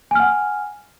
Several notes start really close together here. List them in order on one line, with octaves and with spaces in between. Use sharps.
G#5 F6 F#5